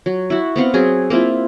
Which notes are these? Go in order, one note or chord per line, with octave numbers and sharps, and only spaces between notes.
F#3
E4 F#4
B3 C4 F5 F#5
F#3 C4 G#4
A#3 C4 E4 F4